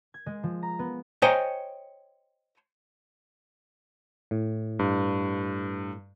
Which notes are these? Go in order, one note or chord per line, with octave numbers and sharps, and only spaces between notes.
G#6
G#3
F3
A#5
B3
C5 C#5 D#5 G5 G#5 A#5
A2
G2